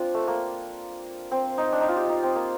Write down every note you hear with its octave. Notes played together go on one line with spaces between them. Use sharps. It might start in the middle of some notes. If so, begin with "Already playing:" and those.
Already playing: C4 D4 F4
A3
A#3
C4
D#4
D4
D#4
F4
G4
D#4
C4
A#3